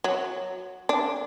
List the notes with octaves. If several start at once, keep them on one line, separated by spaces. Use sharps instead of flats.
F#3
D4